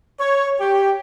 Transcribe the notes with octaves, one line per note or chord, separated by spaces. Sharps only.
C#5
G4